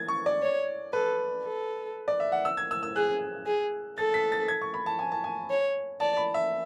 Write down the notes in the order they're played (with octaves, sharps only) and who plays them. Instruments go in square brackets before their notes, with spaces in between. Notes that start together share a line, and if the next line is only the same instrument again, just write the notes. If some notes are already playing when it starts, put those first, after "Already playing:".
Already playing: [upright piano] G#6 A6
C#6
D5
[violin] C#5
[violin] A4 [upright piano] B4
[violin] A4
[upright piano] D5
E5
F#5
E6
G#6
E6
E6
[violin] G#4 [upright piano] F#6
[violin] G#4
[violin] A4 [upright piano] A6
[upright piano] B6
A6
G#6
C#6
B5
A5
G#5
A5
G#5
[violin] C#5
[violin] D5 [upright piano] A5
[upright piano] B5
E5